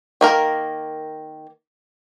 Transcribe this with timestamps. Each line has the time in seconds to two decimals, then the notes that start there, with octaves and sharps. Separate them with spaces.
0.21 D#3 A#3 A#4